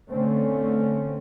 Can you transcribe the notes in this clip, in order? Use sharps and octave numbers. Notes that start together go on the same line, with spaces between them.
D3 A3 C4 C#4